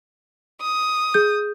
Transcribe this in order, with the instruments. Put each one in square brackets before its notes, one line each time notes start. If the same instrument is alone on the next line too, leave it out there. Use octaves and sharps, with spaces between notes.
[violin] D#6
[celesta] G#4 G6